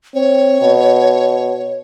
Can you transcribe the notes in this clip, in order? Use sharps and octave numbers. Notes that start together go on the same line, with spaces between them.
C4 C#5
B2